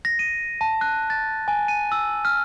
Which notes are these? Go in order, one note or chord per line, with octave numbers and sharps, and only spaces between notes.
A#6
D#7
A5
F#6
A6
G#5
D#7
E6
F6